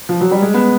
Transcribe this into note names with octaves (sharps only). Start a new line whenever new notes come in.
F3
F#3
G3
G#3
B3